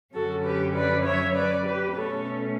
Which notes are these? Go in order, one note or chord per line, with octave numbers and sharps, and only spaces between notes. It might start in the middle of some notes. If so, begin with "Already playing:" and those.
F#2 D3 F#3 C#4 F#4 A4
G4 B4
B4 D5
C#5 E5
B4 D5
G4 B4
B2 A3 C#4 A4 C#5